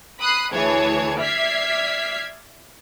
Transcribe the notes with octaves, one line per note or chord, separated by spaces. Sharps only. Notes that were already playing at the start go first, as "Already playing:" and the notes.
B5 D#6 F#6 C7
D2 E3 G#4 C#5 A5 G#6
D5 E5 F6 G#6 B6 C7